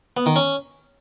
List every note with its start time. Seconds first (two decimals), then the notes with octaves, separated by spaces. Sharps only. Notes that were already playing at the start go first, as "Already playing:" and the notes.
0.17 B3
0.26 D#3
0.36 C#4